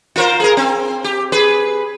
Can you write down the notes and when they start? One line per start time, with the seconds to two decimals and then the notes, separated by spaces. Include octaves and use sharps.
0.16 F4 A#4 C5
0.40 G#4 A#4
0.57 C4
1.04 G4
1.32 G#4 B4